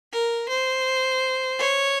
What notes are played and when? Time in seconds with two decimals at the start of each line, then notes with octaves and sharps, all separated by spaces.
0.13 A#4
0.49 C5
1.59 C#5